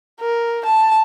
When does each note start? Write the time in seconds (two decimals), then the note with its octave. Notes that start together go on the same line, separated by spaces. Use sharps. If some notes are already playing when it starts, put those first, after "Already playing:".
0.20 A#4
0.65 A5